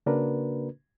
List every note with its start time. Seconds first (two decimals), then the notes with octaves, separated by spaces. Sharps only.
0.06 C#3 A#3 D4 F#4 A#4 B4